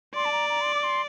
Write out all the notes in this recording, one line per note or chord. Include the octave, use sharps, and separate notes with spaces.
D5 C6
A5
A#5
A#5
C6
D6
C6